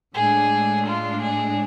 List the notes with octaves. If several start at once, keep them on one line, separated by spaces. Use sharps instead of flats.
A2 G#3 D4 G#4
F4
G#4